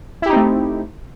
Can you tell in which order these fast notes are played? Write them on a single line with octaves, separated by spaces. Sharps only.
E4 G4 D#4 C4 A3